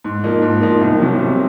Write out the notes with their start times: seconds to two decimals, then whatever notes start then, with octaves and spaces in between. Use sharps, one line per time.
0.04 G#2
0.24 F3 A#3 D#4
0.42 G#2
0.61 F3 A#3 D#4
0.81 C2
0.99 C3 F#3
1.19 C2